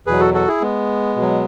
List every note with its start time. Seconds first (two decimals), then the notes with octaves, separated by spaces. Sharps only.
0.07 E2 B2 F#3 G#4 B4
0.20 F#4 A4
0.34 F#4 A4
0.48 E4 G#4
0.62 G#3 B3
1.16 B2
1.21 F#3